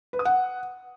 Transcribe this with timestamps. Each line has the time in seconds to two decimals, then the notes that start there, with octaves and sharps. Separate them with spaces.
0.13 B4
0.19 D#6
0.25 F#5